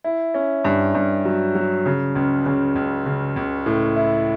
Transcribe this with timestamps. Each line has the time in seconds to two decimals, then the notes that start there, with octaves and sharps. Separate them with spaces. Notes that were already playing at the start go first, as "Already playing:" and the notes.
0.04 E4
0.34 C#4
0.64 G2
0.95 G2
1.25 F#3
1.55 F#3
1.86 C#3
2.15 C#2
2.46 C#3
2.75 C#2
3.06 C#3
3.36 C#2
3.66 A2
3.96 E4